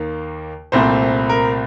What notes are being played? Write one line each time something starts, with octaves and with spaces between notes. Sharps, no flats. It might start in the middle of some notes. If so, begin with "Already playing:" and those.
Already playing: D#2 D#3 A#3
C2 A#2 A3 C4 C5
A#4